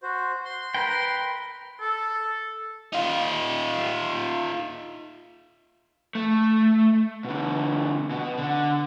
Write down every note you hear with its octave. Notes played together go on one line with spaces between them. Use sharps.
F#4 C5
C6
A#4 B4 G5
A4
D#4 F4
A3
B2 D3
B2
D3